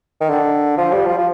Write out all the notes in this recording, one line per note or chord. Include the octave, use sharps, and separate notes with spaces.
D#3
D3
F3
G3
F3
F3